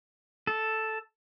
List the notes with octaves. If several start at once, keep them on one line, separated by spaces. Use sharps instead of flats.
A4